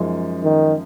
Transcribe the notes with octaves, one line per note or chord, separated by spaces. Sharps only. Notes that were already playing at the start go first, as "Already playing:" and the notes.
Already playing: F#2 F3 G#3 D#4
D#3